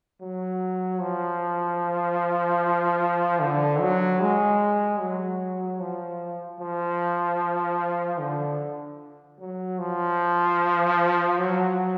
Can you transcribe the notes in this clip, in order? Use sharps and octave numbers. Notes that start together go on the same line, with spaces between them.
F#3
F3
D3
F#3
G#3
F#3
F3
F3
D3
F#3
F3
F#3